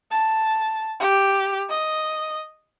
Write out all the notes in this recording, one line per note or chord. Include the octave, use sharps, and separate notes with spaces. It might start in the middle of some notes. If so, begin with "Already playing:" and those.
A5
G4
D#5